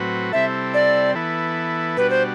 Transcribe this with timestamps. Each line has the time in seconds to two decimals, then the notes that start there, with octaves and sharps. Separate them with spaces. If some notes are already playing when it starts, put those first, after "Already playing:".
Already playing: A2 F#3 C4 F#4 B4
0.32 C3 G3 C4 E4 A4 E5
0.74 D5
1.15 E3 B3 E4 A4
1.97 B2 G3 D4 F#4 B4
2.10 C5